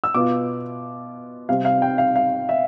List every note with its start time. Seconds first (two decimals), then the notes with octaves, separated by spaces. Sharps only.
0.04 E6
0.14 B2 B3 F4 D6
1.49 C3 G3 C4 F5
1.65 F5
1.82 G5
1.98 F5
2.16 F5
2.49 E5